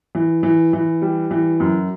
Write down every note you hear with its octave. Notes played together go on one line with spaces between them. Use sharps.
E3
E3
E3
G3
E3
F#2